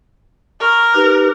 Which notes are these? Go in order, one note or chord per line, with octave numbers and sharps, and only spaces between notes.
A#4 C#6
D#4 G4 B4